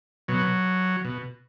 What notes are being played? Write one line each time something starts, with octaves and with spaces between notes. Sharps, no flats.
B2 F#3
B2